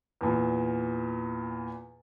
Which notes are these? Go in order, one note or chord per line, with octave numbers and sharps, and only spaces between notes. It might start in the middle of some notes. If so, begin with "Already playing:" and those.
E2 A#2